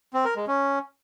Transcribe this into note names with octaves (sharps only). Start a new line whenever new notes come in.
C4
A#4
G#3
C#4